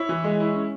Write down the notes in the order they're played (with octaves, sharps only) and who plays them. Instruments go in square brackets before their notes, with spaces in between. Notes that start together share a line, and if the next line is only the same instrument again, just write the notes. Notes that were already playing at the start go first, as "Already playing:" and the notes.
Already playing: [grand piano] E4 C#5
E3
G#3
E4
C#4